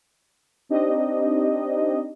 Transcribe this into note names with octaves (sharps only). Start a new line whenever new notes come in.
C4 D4 D#4 G4 D#5